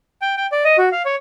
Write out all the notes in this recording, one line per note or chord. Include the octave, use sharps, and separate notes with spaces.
G5
G5
D5
D#5
F#4
F5
C#5